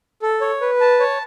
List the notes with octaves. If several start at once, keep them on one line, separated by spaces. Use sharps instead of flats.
A4
C#5
B4
A5
C#5